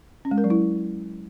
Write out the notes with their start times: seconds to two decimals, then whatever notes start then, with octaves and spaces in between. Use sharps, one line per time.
0.25 C#4
0.31 G#3
0.38 A#4
0.44 F#3
0.50 E4